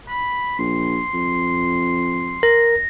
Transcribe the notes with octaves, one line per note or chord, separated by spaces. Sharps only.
B5
A#1 C6
F2
A#4 A#6